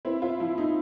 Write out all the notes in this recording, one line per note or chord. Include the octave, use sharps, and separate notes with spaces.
C4 E4
F4
F3 E4
D#4